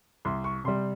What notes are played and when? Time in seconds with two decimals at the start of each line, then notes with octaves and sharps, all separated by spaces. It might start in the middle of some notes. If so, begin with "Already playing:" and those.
0.25 C2 C6
0.44 C#6
0.64 C3 G3 C6